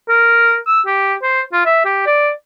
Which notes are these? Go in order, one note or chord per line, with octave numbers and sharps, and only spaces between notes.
A#4
E6
G4
C5
F4
E5
G4
D5